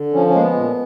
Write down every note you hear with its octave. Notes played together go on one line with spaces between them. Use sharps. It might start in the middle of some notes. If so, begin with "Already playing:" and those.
Already playing: D3
F3 C#4
C#4
G#3 A#3
B3
A#2